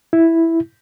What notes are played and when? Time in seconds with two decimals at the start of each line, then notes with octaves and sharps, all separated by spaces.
0.13 E4